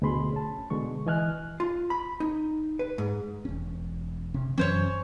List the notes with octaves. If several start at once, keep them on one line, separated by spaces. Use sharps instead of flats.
D2 B2 A3 G#4 B5 C6
C#4 A5
B2 D3 G#3 C#6
E3 D#5 G#5 F6 F#6
F4
B5
D#4
B4
G#2
E1 C#4
C3 C#4
F#2 E3 F#3 C#4 C5 C#5